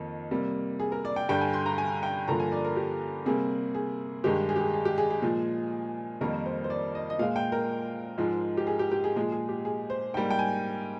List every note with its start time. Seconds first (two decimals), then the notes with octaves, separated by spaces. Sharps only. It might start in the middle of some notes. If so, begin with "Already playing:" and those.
Already playing: F2 D#3 A#3
0.31 C3 G3 A#3
0.80 G#4
0.92 A#4
1.05 D5
1.16 G5
1.29 G2 D3 G3 G5
1.41 G#5
1.54 C6
1.66 A#5
1.78 G#5
2.03 G5
2.28 G2 D3 F3 A#3 A#5
2.40 G#5
2.52 D5
2.65 A#4
2.76 G4
3.26 C3 G3 A#3 G#4
3.75 G#4
4.24 G2 D#3 G#3 G4
4.49 G#4
4.56 G4
4.61 G#4
4.74 G#4
4.85 G4
4.98 G#4
5.10 G#4
5.22 A#2 F3 G#3
6.21 F2 D#3 G3 A#3 A#4
6.46 C5
6.64 C5
6.70 D5
6.95 D#5
7.10 D#5
7.19 A#2 G#3 F5
7.36 G5
7.52 A#4
8.18 G#2 F3 G#3
8.57 G4
8.67 G#4
8.79 G4
8.92 G4
9.04 G#4
9.16 A#2 F3 G#3 G#4
9.32 G#4
9.49 G4
9.65 G#4
9.90 C5
10.14 G#2 G3 A#3 G5
10.30 G5
10.39 G#5